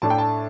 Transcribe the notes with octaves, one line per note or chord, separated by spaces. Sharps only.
A2 A3 D4 A5
G5
A5